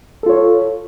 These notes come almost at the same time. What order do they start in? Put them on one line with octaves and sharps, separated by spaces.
A4 F4 C#5